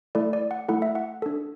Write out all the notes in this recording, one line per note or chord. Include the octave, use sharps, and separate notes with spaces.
A3 E4 A4 D5
D5
F#5
A3 E4 A4 F#5
E5
F#5
D4 A4